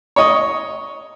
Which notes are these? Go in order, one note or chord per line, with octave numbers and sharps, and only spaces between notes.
C#5 D#5